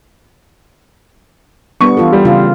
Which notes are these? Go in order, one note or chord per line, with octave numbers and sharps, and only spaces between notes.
G3 B3 D4 C#6
E3 F4 A4
G3
C#3 F4